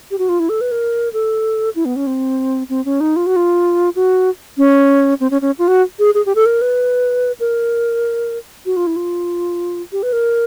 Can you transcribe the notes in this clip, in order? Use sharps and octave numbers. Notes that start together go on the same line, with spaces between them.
G4
F#4
F4
E4
A4
B4
A#4
A4
E4
B3
C#4
C4
C4
C#4
D#4
F4
F#4
F4
F#4
C#4
C4
C#4
C#4
F4
F#4
G#4
G#4
G4
A4
A#4
B4
A#4
F#4
F4
E4
F4
G4
B4
A#4